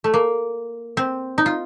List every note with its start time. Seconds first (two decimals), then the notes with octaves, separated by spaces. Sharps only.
0.04 A3
0.14 A#3
0.97 C4
1.38 D#4
1.46 F4